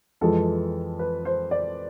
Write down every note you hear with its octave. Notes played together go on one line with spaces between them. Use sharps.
F2 E3 G#3 A4
B4
C5
D5